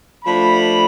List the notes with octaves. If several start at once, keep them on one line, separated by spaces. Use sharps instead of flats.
F3 A3 D4 B5